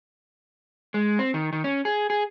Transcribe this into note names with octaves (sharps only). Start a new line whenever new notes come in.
G#3
C4
D#3
D#3
C#4
G#4
G#4